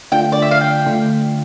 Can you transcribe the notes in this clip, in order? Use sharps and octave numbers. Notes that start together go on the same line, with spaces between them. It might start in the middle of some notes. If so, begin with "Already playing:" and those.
D3 A3 D4 F4 G5
D5
E5
F5
G5
D3 A3 D4 F4